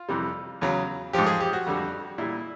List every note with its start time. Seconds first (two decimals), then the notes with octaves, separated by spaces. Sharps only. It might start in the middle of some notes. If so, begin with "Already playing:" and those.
Already playing: F4
0.08 F2 C3 E3 G3
0.61 E2 C#3 F#3
1.13 G#2 F3 G4
1.26 G#4
1.40 G4
1.53 F#4
1.66 F2 D3 G3
2.18 A#2 G3 E4